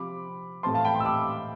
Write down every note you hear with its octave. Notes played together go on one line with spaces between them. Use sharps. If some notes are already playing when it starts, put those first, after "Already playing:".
Already playing: C3 F3 C4 B5 D6
A2 E3 A3 C4 A5 C6
F5 A5
G5 B5
A5 C6
E6
B5 D6